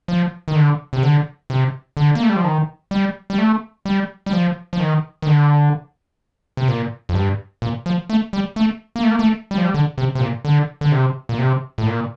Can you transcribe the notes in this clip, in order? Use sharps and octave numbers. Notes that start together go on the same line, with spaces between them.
F3
D#3
D3
C3
D3
C3
D3
A#3
A3
G3
F3
D#3
G3
G3
A3
G3
G3
F3
F3
D#3
D#3
D3
C3
A#2
F2
G2
A#2
F3
A3
G3
A3
A#3
A3
A#3
A3
G3
F3
G3
D3
C3
C3
A#2
D3
D3
C3
A#2
C3
A2
A#2